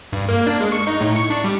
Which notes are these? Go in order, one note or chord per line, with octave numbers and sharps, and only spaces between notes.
G2
A#3
D4
G#3
C#6
D#4
A2
C#6
D4
G3